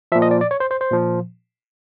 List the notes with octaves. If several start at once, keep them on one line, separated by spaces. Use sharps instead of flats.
A#2 F3 E5
D#5
D5
D5
C#5
C5
C5
C5
A#2 F3